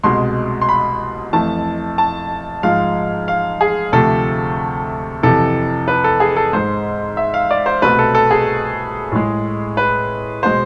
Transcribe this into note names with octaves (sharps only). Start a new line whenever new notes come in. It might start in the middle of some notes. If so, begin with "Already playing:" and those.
C2 B2 G#3 C6
C6
B5
F2 E3 A3 A5
A5
G#2 F3 G#3 F5
F5
G#4
D2 C3 F3 A3 A4
F2 C3 E3 A4
B4
A4
G#4
A4
G#2 G#3 C5
E5
F5
D5
C5
C2 B2 A3 B4
A4
A4
G#4
A2 G#3
B4
B2 G#3 C5